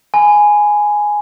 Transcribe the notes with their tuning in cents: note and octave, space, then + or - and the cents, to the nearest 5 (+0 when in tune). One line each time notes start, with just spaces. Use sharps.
G#5 +0 B5 +20